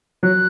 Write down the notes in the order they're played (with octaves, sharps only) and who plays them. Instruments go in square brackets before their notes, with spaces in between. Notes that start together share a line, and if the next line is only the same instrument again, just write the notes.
[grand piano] F#3 [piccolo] F#6